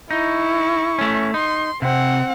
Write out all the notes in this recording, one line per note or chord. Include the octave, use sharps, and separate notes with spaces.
D#4 E4 C#6
A3 C#4
D#4 C6
C3 C4 F#5